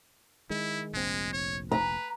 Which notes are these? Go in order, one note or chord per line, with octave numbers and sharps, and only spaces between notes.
D#3 G#3 E4
F1 A#1 G#3 C4
C#5
B4 A#5